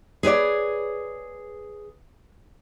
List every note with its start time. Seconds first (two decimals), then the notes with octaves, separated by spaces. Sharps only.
0.23 G#4 B4 C#5 D5